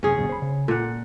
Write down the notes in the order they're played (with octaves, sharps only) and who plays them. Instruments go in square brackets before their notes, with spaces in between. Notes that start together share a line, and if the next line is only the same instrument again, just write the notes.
[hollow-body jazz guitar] F#2 C3 [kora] C#4 G#4
[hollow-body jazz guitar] D2 G2 B2
C5 B5
C#3
[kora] A#2 F#5 [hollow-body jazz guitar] A4